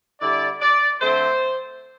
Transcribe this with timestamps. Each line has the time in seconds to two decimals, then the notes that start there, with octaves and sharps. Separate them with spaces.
0.20 D3 G3 E4 D5
0.61 D5
1.01 D3 A3 C4 C5